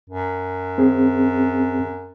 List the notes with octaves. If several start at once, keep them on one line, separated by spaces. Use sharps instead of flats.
F#2
C4 G#4